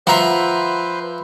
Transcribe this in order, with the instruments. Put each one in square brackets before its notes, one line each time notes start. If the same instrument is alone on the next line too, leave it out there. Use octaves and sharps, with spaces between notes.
[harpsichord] F3 E5 [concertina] B4 C5 [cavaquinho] F#5 A#5 C6